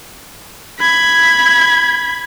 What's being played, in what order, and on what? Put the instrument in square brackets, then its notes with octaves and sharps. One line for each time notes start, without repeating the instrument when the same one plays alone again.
[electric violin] B5 G#6